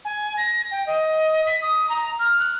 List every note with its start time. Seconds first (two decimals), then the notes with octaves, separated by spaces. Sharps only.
0.04 G#5
0.37 A#6
0.71 G5
0.86 D#5
1.46 B6
1.61 D#6
1.89 A#5
2.19 F6
2.39 F#6